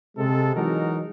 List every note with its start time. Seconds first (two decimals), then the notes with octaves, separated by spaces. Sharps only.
0.17 C3 G#3 A4
0.56 E3 F#3 G#3 D#4 F#4 A#4